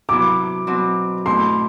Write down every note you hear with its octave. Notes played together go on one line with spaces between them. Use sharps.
C3 F#3 B3 E4 D6
B2 F#3 C4
B2 A3 E4 C6